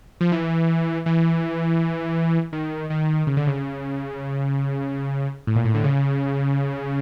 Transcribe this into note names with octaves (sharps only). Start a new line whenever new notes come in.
F3
E3
E3
D#3
D#3
C#3
D3
C#3
A2
A#2
A2
D3
C#3